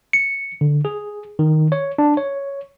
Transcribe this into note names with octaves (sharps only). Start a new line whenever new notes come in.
C#7
D3
G#4
D#3
C#5
D4
C#5